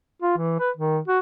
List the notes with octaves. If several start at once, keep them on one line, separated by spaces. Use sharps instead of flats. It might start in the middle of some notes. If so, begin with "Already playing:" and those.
F4
E3
B4
D#3
F#4